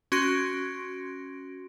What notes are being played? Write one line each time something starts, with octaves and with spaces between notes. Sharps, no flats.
C#4 F#4 C6 A#6 D7